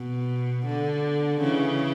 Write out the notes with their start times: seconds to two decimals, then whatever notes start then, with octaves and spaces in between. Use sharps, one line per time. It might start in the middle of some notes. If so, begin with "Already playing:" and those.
Already playing: B2
0.66 D3
1.41 C#3 E3